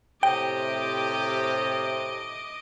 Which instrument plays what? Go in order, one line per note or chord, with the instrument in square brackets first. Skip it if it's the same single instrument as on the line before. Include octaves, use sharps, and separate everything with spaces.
[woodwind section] A2 C3 [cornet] G4 [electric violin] D#5 D6 [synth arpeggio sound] G5